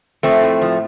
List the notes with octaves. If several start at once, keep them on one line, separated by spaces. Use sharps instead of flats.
F3 A3 C4
A2
F3